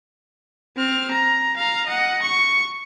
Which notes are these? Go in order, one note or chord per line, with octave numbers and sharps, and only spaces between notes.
C4 F6
A#5
F5 A#5
D#5 F#5
C#6